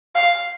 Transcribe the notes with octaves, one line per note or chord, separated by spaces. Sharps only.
F5